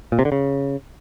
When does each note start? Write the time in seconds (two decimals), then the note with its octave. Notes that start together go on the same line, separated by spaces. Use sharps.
0.12 A#2
0.19 C3
0.25 D3
0.32 C#3